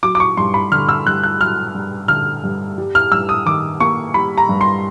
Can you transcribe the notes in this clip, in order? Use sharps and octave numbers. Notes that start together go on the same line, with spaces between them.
F#3 D6
D6
C#6
G2 C6
B5
D3 F6
E6
G2 F#6
F#6
F#3 F6
G2
D3 F6
G2
G3
F6
G2 E6
D#6
D#3 D6
A#3 C#6
G3 B5
A#5
G2
C6